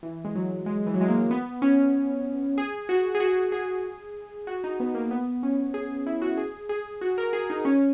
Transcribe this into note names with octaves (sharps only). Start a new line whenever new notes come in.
E3
G#3
F#3
G#3
E3
F#3
G#3
A#3
B3
C#4
G#4
F#4
G#4
F#4
G#4
F#4
D#4
B3
A#3
B3
C#4
G#4
E4
F#4
G#4
G#4
F#4
A#4
G#4
D#4
C#4